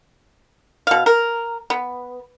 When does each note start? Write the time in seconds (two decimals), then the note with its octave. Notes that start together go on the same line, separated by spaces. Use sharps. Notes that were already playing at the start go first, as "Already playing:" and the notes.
0.87 B2 F5
1.06 A#4
1.70 B3